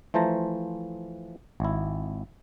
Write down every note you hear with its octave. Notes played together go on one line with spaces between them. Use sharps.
E3 F3 A3 C5 A5 A#5
G#1 E4